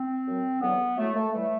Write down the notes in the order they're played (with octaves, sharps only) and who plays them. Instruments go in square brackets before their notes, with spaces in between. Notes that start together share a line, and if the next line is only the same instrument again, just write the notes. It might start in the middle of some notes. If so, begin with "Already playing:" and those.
Already playing: [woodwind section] C4
F#2 F#3
E2 D3 F#3 B3
A2 F#3 A3
A3
A2 E3 G3 A3